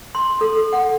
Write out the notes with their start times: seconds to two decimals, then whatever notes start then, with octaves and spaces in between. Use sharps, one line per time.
0.15 C6
0.41 A4
0.73 F#5